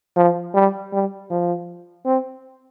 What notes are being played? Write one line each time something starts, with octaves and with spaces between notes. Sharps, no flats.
F3
G3
G3
F3
C4